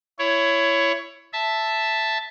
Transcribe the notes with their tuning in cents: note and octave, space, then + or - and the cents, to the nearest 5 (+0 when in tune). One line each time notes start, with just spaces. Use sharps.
E4 +20 C#5 +10
E5 +0 A5 +0